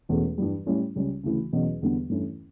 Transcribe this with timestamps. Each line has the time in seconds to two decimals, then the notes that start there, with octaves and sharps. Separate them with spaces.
0.09 E1 E2 B2 A3 C#4
0.38 G2 E3 G3
0.66 A2 G3 C#4 E4
0.95 C#2 C#3 G3 C#4
1.24 D2 C#3 E3
1.53 E1 E2 B2 F#3 C#4
1.81 E2 D3 G3 B3
2.09 G2 E3 A3 C#4 E4